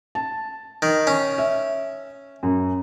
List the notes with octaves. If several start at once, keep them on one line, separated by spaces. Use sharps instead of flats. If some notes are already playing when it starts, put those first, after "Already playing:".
A5
D#3
C#4
E5
F#2